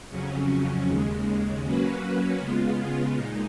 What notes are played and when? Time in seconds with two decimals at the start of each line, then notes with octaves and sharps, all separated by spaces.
0.10 F2 C#3 F#3 C#4
0.87 D#2 C#3 G#3
1.64 F#3 A#3 C#4 F#4 B4
2.40 C#3 G#3 B3 F4
3.16 A#2 G#3 D#4